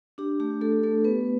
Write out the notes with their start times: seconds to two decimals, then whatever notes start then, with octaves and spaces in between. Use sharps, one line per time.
0.18 D4 G4
0.40 A3 G4
0.61 A3 A4
0.83 A3 A4
1.04 B3 B4